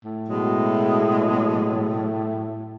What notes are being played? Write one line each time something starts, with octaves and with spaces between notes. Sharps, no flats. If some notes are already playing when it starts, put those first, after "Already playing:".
A2
B2 F#3 G#3